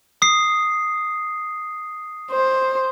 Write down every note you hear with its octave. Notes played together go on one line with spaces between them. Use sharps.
D#6 C7
C5